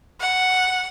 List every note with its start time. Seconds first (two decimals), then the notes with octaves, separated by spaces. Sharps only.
0.21 F#5